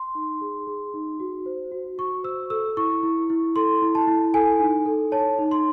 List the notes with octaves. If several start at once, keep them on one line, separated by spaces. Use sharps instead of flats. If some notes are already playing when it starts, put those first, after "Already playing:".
Already playing: C6
D#4
G#4
G#4
D#4
F#4
C5
F#4
F#4 C#6
C5 E6
A4 E6
E4 C#6
E4
E4
A4 C6
E4
A5
E4
A4 G#5
D#4
A4
C#5 A5
D#4
C6